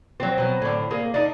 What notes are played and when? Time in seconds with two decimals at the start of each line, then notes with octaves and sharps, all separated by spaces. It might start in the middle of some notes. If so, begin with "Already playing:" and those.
0.20 F#3 C4
0.38 B2 F#3
0.62 A2 D3
0.91 A#3 G#4
1.14 D4 D#4